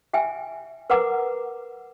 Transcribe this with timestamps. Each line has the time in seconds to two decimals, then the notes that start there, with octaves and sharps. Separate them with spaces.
0.13 E5 G5 G#5
0.90 A#4 B4 F#5 A#5 D6